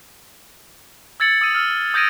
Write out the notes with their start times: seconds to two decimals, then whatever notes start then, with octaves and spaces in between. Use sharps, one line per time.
1.20 E6 G#6 A6 C#7 F#7
1.41 D#6 E6 D#7
1.54 E6 F6
1.94 D#6 G6 G#6 A#6 D7 D#7